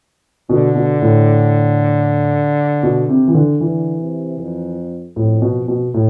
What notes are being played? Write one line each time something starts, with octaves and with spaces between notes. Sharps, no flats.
B2 D3
B2
A2
B2
C3
E3
D3
D3 E3
C3
F2
F2 A2
B2
B2
A2